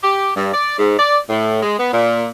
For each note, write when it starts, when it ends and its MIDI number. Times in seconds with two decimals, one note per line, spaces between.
0.03 0.31 67
0.36 0.51 43
0.54 0.77 74
0.78 0.97 44
0.99 1.18 74
1.29 1.62 45
1.63 1.77 56
1.78 1.92 59
1.92 2.27 46